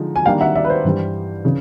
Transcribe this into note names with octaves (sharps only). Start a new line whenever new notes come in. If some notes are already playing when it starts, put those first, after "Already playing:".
Already playing: D3 F3 G#3 D#4
G#5
D#3 G3 A#3 D4 F5 G5
E5 F#5
D5 E5
B4
C5
G2 E3 G3
C#3 E3